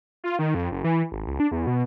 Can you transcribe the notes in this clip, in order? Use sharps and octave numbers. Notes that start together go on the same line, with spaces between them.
F4
D#3
F2
F#1
E3
G#1
C#2
D4
E2
B2